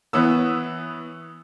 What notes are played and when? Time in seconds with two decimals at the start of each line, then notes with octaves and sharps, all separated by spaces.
0.13 E3 B3 C#5 D#6 E6